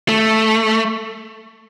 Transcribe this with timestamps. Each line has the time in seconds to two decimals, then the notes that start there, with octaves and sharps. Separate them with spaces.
0.09 A3